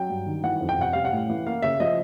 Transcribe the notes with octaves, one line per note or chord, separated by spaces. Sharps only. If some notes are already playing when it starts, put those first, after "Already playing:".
Already playing: F#3 G5
G2
D#3
E3 F#5
F2
G5
C3 F#5
G3 F5
F#5
A2
E3
A#3 F5
C#3 E5
F3 D#5